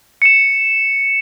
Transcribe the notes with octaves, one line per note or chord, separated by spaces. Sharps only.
C#7 E7